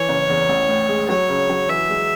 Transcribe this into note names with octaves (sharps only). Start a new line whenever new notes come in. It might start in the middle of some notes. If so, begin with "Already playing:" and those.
Already playing: E3 C#5
F#1
E2
A1
A2
G#3
F#3 C#5
C#3
F#3
E3 E5
G#3